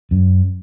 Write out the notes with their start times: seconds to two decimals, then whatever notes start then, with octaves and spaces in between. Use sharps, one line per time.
0.11 F#2